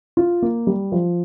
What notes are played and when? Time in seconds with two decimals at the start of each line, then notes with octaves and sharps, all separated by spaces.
0.17 F4
0.42 A#3
0.67 G3
0.92 F3